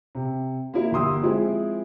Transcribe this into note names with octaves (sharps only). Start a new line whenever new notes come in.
C3
A#3 E4
G1 A#3 G4 C6 D#6 E6
F3 G#3 C4 E4 G#4